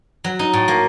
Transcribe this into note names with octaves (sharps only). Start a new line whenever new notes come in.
F#3
D#4
A2
A#3